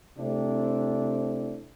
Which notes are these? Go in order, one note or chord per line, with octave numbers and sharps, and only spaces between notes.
C3 A3 C4 D4 E4